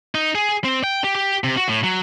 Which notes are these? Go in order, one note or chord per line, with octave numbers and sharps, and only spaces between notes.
D#4
G#4
C4
G5
G4
G4
C3
F#4
A2
F#3